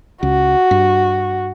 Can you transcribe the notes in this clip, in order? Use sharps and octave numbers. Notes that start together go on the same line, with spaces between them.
C#2 F#4
G2